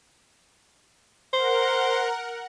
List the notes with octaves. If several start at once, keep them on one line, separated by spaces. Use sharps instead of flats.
A#4 C5 F#5